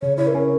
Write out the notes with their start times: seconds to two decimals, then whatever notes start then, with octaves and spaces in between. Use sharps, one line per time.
0.02 C#3 C#5
0.17 E4 C#5
0.27 A#4
0.35 C#4